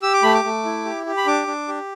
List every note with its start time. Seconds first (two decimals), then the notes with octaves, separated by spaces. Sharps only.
0.03 G4 E6
0.13 D6
0.23 A3 B5
0.34 D6
0.44 A3
0.65 E4
0.85 G4
1.06 G4
1.17 B5
1.27 D4 D6
1.47 D4
1.68 G4